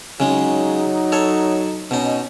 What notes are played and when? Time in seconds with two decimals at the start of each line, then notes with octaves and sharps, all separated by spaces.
0.20 C#3 F#3 G#3 D#4
1.12 A4 C#5
1.91 B2 C#4 D#4